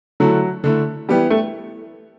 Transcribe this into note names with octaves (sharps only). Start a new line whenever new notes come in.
D3 F#3 A3 E4
D3 A3 E4
E3 G3 B3 E4 G4
A3